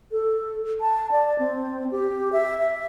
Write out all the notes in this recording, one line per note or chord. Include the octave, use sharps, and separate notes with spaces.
A4
A5
D5
C4
G4
E5
E5